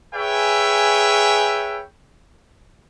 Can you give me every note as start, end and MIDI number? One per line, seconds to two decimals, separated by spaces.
0.14 1.81 68
0.14 1.81 71
0.14 1.81 73
0.14 1.81 76
0.14 1.81 79
0.14 1.81 80